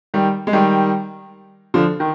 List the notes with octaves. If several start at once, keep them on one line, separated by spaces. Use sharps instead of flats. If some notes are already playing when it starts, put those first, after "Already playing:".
D#3 G3
G#3
D#3 G3
D3 F3
D#3